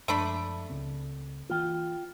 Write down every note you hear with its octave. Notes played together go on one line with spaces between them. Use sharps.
F#2 F3 G#3 A3 D4 B5
C#2 C#3 C4
E3 A#3 F4 G5